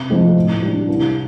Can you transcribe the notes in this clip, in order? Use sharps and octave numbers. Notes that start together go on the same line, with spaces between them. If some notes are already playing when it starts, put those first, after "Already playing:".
Already playing: C3
F3 A3 C4 D#4
A2
G3 D4
C2